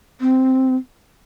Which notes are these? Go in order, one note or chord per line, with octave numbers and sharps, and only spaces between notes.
C4